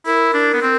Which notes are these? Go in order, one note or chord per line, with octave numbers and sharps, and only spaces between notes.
E4 A#4
D4
B3
C4